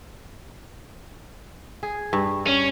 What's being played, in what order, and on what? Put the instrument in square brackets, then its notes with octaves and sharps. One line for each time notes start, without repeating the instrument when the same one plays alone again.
[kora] G#4
G2
[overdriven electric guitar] C#4